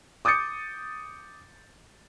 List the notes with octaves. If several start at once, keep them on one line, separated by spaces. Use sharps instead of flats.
D6 D#6 G6 A6 C#7